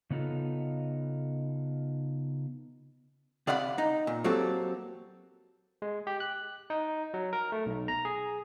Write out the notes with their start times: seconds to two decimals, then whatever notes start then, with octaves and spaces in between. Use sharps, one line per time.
0.11 C#3 B3 D#4 F4 A4
3.47 C3 D5 F5 F#5 B5
3.78 D#4
4.07 A#2
4.24 F#3 A#3 C4 F#4 G4 A4
5.82 G#3
6.07 G4
6.20 F#6
6.70 D#4
7.14 F#3
7.33 A#4
7.52 A3
7.66 B1
7.88 A#5
8.05 G#4